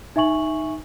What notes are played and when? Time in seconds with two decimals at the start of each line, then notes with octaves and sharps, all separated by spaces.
0.16 D#4 E5 G#5 C#6 F#7